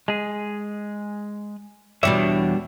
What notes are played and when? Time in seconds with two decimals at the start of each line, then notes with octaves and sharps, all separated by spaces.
0.08 G#3 G#4
2.03 E2 B2 G3 D4 C#5 E5